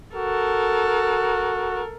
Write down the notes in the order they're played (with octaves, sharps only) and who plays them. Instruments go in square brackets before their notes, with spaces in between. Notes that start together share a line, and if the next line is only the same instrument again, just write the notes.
[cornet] F#4 [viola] A4 A#4